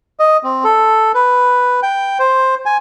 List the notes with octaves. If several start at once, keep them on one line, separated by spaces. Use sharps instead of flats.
D#5
C4
A4
B4
G5
C5
G#5